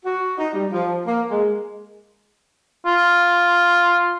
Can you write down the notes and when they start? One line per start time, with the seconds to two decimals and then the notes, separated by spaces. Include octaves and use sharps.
0.05 F#4
0.38 D#4
0.53 G3
0.72 F3
1.07 A#3
1.30 G#3
2.86 F4